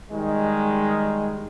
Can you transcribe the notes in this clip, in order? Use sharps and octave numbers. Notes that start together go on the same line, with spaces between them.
D#3 G3 G#3